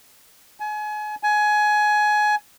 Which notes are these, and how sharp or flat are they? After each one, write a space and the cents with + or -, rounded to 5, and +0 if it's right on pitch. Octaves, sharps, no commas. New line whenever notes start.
G#5 +30
G#5 +20